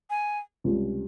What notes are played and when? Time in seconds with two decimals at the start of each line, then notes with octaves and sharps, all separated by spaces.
0.10 G#5
0.64 C#2 C3 G3